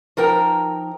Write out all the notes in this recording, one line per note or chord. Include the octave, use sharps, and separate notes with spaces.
F3 D#4 A#4 G5 A#5